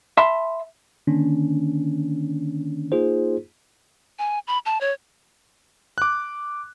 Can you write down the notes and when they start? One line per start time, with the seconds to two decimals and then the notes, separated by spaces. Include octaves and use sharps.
0.17 E5 A5 B5 C6
1.07 D3 D#3 A#3 C#4 D4
2.92 A#3 D#4 F4 G#4 C5
4.19 G#5
4.47 B5
4.66 A5
4.81 C#5
5.98 D6 F#6